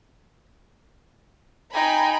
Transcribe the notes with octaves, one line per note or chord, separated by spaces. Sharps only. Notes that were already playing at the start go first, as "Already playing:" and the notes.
D#4 G5 G#5 B5